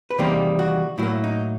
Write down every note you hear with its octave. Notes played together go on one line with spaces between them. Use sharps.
B4
E2 C3 D#3 G3 A#3 C5
F#4
A2 F#3 A#3 E4
D#4